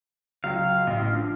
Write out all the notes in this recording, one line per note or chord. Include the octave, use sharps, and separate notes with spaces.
C#2 F#3 F5
A1
D3 F3